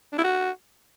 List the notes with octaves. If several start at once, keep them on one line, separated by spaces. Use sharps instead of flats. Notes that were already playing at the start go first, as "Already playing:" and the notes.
D4
E4
F#4